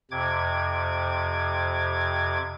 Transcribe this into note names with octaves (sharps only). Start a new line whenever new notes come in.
F2 C3 D6 G#6